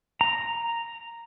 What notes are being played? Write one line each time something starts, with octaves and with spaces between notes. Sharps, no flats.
A#5